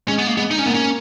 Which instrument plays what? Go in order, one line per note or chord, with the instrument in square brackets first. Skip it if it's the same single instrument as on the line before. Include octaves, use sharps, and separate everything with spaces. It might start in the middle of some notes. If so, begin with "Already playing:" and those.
[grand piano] G#3 [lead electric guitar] C#4
[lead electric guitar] B3
A#3
[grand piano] G#3 [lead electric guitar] B3
[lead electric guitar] D#4
C#4
[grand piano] A#3 [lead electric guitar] B3
[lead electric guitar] C#4